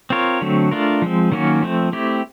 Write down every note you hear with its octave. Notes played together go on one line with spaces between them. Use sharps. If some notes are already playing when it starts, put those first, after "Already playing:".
C4 F4 A#4 C#5
D3 F#3 A3 C4
A3 D4 F4 A#4
F3 G#3 C4
D#3 F#3 A#3 C#4 F#4
F3 A3 C4
A3 C4 E4 G4